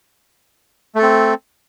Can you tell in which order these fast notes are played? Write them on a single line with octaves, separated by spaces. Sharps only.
A3 A4 C4